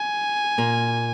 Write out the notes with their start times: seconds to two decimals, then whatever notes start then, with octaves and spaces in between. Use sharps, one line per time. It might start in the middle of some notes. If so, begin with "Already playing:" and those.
Already playing: G#5
0.58 A#2 A#3